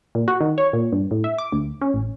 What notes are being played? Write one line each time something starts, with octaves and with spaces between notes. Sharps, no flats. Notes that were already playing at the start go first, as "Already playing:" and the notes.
A#2
F#4
D#3
C#5
A#2
G2
A2
E5
D6
D2
C#4
A1